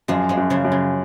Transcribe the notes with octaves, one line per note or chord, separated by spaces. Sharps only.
F#2 F3 G#3
F3 G#3
F#2
C#3 F3
F#2
C#3